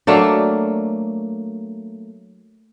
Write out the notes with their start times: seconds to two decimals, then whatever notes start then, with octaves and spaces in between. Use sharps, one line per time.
0.07 F#3 A3 A#3 D4